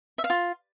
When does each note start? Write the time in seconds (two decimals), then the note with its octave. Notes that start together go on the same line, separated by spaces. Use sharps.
0.18 E5
0.24 F5
0.30 F4